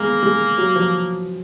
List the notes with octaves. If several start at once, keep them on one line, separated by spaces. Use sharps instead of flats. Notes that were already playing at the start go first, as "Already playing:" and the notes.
Already playing: G#3 A#3 B3
G#3
F#3
F3